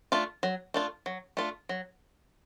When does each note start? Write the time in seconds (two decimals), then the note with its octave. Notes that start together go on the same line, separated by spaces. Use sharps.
0.12 A3 D4 F4
0.43 F#3
0.74 A3 D4 F4
1.06 F#3
1.37 A3 D4 F4
1.69 F#3